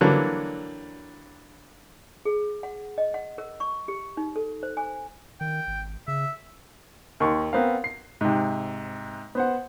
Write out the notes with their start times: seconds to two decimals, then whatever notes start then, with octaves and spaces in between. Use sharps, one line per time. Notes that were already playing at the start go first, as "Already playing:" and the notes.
0.01 D3 E3 F#3 G3 A#3
2.25 G#4
2.63 F#5
2.98 D#5
3.14 F#5
3.38 A#4
3.60 C#6
3.88 G4
4.17 D#4
4.36 A4
4.63 C5
4.77 G#5
5.41 D#3 G5
5.67 G#1
6.08 C#3 E5
7.20 D#2 D#4 C6 C#6
7.53 B3 C4 A#4 F5
7.84 C7
8.21 G#2 C3
9.35 B3 C5 F#5